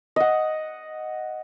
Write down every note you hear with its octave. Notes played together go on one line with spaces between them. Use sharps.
D#5 F#5